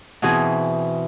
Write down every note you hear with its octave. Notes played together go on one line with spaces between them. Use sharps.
B2 E3 C4 G#4